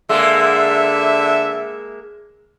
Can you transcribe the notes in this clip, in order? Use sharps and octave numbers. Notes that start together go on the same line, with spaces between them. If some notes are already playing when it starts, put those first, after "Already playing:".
D3 G#3 A#3 E5